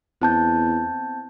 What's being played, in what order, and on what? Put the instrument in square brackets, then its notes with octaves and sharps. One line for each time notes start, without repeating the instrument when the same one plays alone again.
[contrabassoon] E2 [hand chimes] C4 A5 G6